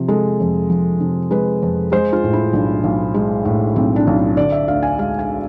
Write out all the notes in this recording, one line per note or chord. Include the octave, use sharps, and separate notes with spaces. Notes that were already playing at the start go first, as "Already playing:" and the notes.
Already playing: C3 F3
G#3 A4
F2
F3
C3
G#3 B4
F2
G#3 C5
F4
A2
E4
B1 D4
B1
G#3
A2
B1 C4
D4
B1
D3 D5
E5
D2 F5
G#5
G#3 F5
G#5